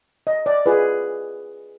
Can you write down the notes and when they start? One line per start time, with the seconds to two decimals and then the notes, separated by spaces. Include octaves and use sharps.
0.27 D#5
0.46 D5
0.66 F4 G#4 B4